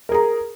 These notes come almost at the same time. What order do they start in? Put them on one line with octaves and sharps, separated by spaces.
A#4 G#4 A#5